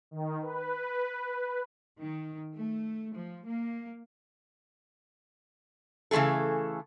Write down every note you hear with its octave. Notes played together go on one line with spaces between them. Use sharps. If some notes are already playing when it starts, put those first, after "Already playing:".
D#3
B4
D#3
A3
F3
A#3
C#3 E3 A3 G#4 A4